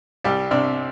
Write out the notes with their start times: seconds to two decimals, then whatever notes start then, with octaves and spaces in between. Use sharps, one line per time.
0.24 C2 G3 G4
0.51 C3 D4 D5